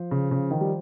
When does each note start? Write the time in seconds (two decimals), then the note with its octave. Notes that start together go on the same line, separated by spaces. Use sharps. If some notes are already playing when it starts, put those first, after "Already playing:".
Already playing: F3
0.11 C#3
0.31 C#3
0.51 D#3
0.61 G3